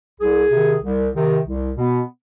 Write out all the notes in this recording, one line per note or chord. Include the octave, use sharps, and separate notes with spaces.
C2 G#4
C3
D#3
C2
C3 D#3
C2
B2 B3